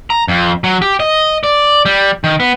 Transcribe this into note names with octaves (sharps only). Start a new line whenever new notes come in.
A#5
F2
F#3
G4
D#5
D5
G3
D#3
B3